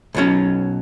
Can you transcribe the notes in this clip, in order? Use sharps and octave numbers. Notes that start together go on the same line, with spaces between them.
B1 B2 F#3 C#4